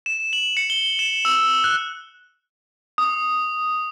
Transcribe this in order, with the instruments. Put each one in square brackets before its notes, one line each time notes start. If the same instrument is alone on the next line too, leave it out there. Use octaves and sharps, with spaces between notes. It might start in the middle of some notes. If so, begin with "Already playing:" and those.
[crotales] E7
F#7
C#7
G7
E7
E6
F#6
D#6